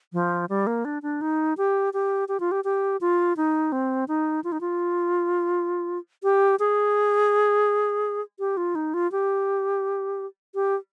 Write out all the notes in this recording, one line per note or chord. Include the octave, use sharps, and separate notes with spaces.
F3
G3
A#3
D4
D4
D#4
G4
G4
G4
F4
G4
G4
F4
D#4
C4
D#4
F4
D#4
F4
G4
G#4
G4
F4
D#4
F4
G4
G4